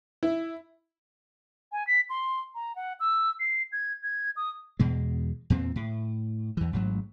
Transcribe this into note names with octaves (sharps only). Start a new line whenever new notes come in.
E4
G#5
B6
C6
A#5
F#5
E6
C7
G#6
G#6
D#6
E2 B2 G#3
E2 A#2 C4
A2
E2 E3
A1 G#2 F#3